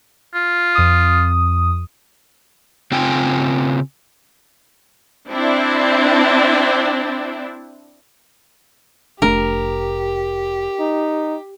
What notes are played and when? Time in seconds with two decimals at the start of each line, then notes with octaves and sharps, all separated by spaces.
0.34 F4
0.75 F2 D#6
2.92 C#3 C4 F4 G5 G#5
5.30 C4 D4 E4
9.22 F1 A3 D4 G4 A#4
10.80 D#4